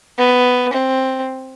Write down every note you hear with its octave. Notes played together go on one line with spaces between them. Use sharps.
B3
C4